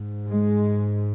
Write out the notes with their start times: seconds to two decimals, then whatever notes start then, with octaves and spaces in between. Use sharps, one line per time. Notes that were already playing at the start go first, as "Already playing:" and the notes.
Already playing: G#2
0.28 G#3